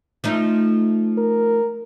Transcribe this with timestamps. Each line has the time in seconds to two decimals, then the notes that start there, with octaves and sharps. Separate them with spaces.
0.24 F3 A3 D#4
1.18 A#4